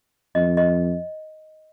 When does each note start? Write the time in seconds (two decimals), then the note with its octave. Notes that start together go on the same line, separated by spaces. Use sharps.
0.35 F2 D#5
0.57 D#5